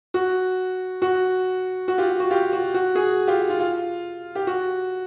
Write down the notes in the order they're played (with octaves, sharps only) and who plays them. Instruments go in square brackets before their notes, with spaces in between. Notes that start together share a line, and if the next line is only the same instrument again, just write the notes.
[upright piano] F#4
F#4
F#4
F4 G4
F#4
F4 G4
F#4
F#4
F#4 G#4
F4 G4
F4
F4
G4
F#4